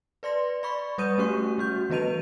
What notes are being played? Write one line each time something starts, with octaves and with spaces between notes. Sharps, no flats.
B4 D5 C6 A#6
D5 B5 C#6
G3 B4 D#6 G6 D#7
A3 C#4 F#4 G4 C#6
G3 F#4 G6
E3 B3 B4 D#5 D#7 F7